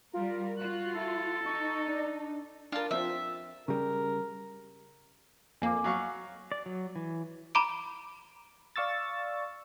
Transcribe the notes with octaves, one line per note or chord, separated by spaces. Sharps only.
G3 F4 A#4
F4 F#4 F#6
E4 A4
D#4 C#6
D4
D4 F4 A#4 A5
F3 C4 F4 E5
C#3 G3 A#4
F2 A#3 G#5 D6
F#3 F5 C#6
D5
F#3
E3
A#5 B5 D6 D7
D5 F5 C#6 E6 A6